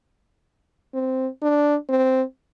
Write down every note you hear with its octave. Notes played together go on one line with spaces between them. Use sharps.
C4
D4
C4